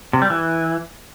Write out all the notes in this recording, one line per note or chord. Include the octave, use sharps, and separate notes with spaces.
C3
G3
E3